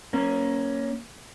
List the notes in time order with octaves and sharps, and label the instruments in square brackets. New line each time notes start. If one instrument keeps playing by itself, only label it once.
[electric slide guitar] A#3 C#4